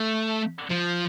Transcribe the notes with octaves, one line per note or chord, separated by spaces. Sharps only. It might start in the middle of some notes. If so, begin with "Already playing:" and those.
Already playing: A3
F3